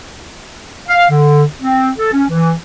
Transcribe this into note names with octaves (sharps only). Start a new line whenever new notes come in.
F5
D3
C4
A4
C#4
E3